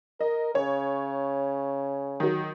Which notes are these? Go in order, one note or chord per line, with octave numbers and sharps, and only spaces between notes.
A#4 D#5
C#3 C#5
D#3 F#3